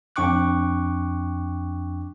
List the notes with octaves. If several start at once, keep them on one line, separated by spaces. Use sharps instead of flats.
F2 D4 G5 C#6 D6 F#6